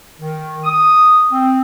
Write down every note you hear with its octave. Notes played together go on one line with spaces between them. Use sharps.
D#3
D#6
C4